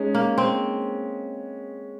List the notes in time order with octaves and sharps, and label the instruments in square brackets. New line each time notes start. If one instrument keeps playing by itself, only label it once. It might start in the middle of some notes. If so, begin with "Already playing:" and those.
Already playing: [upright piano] G#3 C#4 [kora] D#4
[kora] A#3
C4